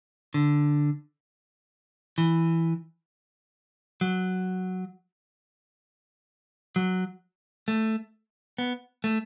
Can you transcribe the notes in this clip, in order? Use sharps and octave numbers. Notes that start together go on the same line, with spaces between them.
D3
E3
F#3
F#3
A3
B3
A3